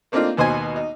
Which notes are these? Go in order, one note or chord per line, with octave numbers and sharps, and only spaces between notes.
A3 A#3 C4 D4 D#4 F4
D#2 B2 C5 D#5 G#5
D#4